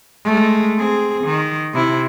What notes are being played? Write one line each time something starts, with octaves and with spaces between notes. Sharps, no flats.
G#3 A3
C4 G#4
D#3
C3 E4